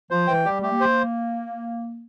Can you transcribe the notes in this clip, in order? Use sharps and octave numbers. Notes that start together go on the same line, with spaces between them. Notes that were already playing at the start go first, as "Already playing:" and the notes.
F3 C5
E3 G5
G3 G4
A3 G4
A#3
C5